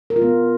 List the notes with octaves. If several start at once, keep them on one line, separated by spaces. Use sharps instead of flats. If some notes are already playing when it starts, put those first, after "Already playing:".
A#4
F4
B3